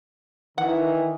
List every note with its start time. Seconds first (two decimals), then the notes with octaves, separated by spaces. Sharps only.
0.58 D#3 E3 F#5